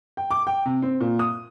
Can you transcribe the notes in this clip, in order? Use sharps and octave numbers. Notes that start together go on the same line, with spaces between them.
G5
D6
G5
C3
C4
A#2
D#6